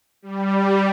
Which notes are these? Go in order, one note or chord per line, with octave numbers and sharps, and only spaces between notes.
G3